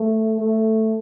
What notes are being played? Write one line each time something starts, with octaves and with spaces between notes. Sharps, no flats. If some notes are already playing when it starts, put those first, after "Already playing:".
Already playing: A3
A3